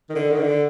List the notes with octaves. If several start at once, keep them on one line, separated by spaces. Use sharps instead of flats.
D#3
D3
D#3
D3